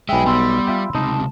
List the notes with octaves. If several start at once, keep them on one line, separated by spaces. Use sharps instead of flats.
B1 G#3 E5 G5 G#5 B5
G3 B3 B5 C6 E6
F4 E5 G5
C#2 C3 D#4 D#5 A5